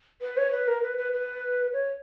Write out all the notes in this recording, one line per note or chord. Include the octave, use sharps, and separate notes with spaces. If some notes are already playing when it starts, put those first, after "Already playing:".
B4
C#5
B4
A#4
B4
B4
B4
C#5